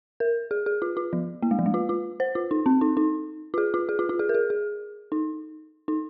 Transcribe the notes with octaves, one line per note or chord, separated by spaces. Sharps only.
A#4
G#4
G#4
F4
F4
F3
A#3
G#3
F3
G#3
F4
F4
C5
F4
D#4
C4
D#4
D#4
F4
G#4
F4
G#4
F4
F4
G#4
A#4
G#4
G#4
D#4
D#4